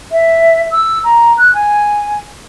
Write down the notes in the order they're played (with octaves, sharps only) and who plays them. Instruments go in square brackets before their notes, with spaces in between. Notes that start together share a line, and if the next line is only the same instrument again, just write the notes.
[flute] E5
E6
A#5
F#6
G#5